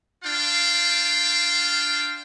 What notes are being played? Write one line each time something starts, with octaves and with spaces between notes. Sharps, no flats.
D4 F4 F5 G5